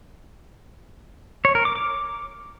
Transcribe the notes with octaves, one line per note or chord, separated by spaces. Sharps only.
C#5
A#4
D6
D6